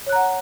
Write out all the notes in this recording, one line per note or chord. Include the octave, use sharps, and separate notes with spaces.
C#5 F#5 A#5 F#6